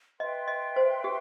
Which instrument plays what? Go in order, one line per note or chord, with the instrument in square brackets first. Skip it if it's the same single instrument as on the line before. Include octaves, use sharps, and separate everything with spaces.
[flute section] B4 E5 G5 C6 [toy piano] D#5
[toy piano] D#5
C5
G4